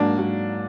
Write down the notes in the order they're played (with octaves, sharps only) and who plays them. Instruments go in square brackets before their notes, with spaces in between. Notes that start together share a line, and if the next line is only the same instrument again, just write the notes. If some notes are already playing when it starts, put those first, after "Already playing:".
Already playing: [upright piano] G#2 F#3 A#3 [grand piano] D4
[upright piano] F#3 A#3